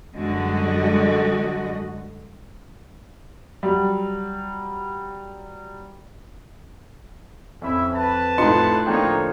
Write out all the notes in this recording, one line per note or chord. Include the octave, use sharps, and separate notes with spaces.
F#2 D3 G3 G#3 F#4 D#5
F#3 G3
F2 C#4 E4 E5 B5
B4 A5
A2 D#4 F4 C6 C#7
D3 F3 A#3 D#4 C#5 G5